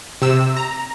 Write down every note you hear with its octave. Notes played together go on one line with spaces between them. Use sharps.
C3 E6
A#5